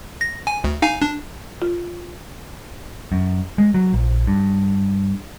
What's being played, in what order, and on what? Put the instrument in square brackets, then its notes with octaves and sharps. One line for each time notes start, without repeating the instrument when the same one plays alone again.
[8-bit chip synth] A#6
G#5
D2
D#4 F5 G#5
D4
[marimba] F4
[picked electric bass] F#2
G#3
F#3
A#1
G2